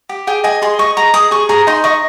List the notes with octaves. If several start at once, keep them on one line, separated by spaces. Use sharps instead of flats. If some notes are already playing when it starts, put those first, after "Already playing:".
G4
G#4 G5
D#5 G#5
G#4 C6
D#5 C#6
G#4 A#5
G#4 D#6
G#4 C#6
G#4 A#5
D#4 C6
D#5 C#6